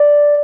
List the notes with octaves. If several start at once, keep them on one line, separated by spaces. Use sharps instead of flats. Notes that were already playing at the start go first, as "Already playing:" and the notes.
Already playing: D5